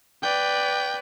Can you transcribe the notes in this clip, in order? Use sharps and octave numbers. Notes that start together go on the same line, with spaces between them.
B4 D5 G5